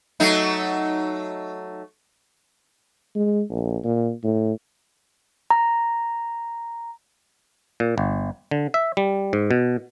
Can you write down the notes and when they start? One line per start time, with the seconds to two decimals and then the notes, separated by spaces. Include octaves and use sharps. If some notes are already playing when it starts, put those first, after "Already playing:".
0.20 F#3 A3 D#4
3.15 G#3
3.50 A#1
3.84 A#2
4.24 A2
5.50 A#5
7.80 A#2
7.98 G1
8.51 D3
8.74 E5
8.97 G3
9.33 G#2
9.51 B2